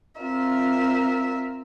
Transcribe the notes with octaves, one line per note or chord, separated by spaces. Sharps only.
C4 F4 A#4 E5